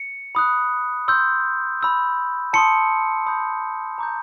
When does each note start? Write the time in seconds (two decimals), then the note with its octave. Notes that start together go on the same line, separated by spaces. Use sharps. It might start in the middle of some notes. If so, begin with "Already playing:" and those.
Already playing: C#7
0.35 B5 D#6 F#6
1.08 C6 E6 G6
1.81 B5 E6 G6
2.53 A5 C6 D#6 C#7
3.27 B5 D#6 G6
3.98 A#5 D6 G6